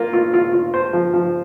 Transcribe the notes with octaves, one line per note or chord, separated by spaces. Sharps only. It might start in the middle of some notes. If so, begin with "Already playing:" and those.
Already playing: A#3 F4
F4
F4
F4
C5
F3
F3